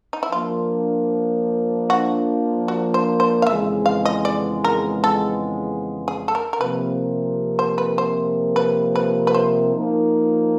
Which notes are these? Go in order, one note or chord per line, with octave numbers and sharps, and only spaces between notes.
D#4
E4
F3 A#3 D4 F4
F#4
F#4
C5
C5
F5
F2 C#3 E3 G#3 B3 E5
F5
D#5
D5
A#4
A4
G#4
A4
A#4
A#4
C3 F3 A#3 B4
C5
B4
C5
B4
B4
B4
C5
F3 A#3 D#4